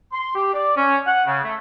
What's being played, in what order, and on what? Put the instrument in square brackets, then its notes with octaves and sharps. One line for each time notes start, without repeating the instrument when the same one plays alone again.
[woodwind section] C6
G4
D5
C#4
F#5
C#3
A3